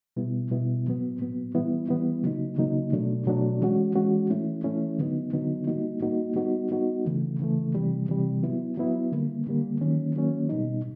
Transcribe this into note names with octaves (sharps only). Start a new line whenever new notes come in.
B2 G3 B3 E4
B2 G3 B3 E4
A#2 F#3 B3
A#2 F#3 B3
E3 G3 B3 E4
E3 G3 B3 E4
C#3 F#3 A#3 D#4
C#3 F#3 A#3 D#4
B2 F#3 A3 D4
B2 F#3 A3 D4
E3 G#3 C#4 F#4
E3 G#3 C#4 F#4
E3 A3 C#4 E4
E3 A3 C#4 E4
D3 F#3 B3 D#4
D3 F#3 B3 D#4
G3 A#3 D#4 F#4
G3 A#3 D#4 F#4
G3 B3 D#4 F#4
G3 B3 D#4 F#4
C#3 E3 A3
C#3 E3 A3
C3 E3 G3
C3 E3 G3
F#3 B3 E4
F#3 B3 E4
D3 G3 A#3
D3 G3 A#3
D#3 F#3 A#3 C#4
D#3 F#3 A#3 C#4
B2 G3 B3 D#4